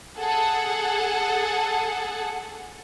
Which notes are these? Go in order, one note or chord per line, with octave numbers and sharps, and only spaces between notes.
G#4 A4 F#5